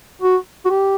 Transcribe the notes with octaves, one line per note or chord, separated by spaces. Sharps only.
F#4
F#4
G4